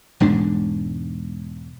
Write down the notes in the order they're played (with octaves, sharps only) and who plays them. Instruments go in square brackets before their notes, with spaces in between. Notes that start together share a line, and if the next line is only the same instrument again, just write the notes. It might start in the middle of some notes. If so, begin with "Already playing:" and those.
[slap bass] E1 G#2 D4